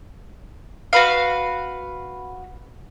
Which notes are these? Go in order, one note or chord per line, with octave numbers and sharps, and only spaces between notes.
F#4 B4 F5